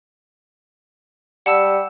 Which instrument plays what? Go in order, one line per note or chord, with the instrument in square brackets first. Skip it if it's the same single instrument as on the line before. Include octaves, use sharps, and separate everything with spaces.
[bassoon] G3 [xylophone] F#5 A5 E6